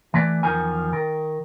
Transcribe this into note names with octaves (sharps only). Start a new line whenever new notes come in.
E3 A3 B4 D5
E2 D#3 F3 A#4 G#5
D#3 A#4